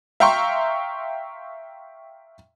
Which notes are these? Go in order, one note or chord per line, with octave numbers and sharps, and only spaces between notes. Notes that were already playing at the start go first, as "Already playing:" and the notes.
E5 F5 G5 A#5 C6 C#6